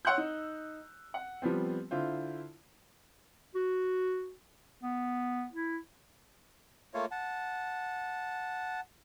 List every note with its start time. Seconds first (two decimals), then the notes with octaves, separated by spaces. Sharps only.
0.05 C#5 F#5 C6 E6 F#6 G6
0.18 D#4
1.14 F#5
1.42 F3 G3 B3 C4
1.91 D3 E4 F4 C5
3.55 F#4
4.83 B3
5.52 E4
6.94 A3 A#3 F4 C#5
7.11 F#5 A5